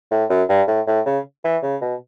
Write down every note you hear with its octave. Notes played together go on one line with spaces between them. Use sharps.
A2
F#2
G2
A2
A2
C#3
E3
C#3
B2